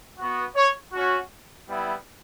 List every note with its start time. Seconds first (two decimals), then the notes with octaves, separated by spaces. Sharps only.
0.18 B3 F#4
0.56 C#5
0.92 C#4 F#4
1.68 G3 B3 E4